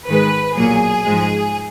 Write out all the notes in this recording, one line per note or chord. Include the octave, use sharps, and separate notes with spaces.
G#2 D#3 G#3 B4
B1 A#2 F#3 A#3 G#4
G#2 F3 G#3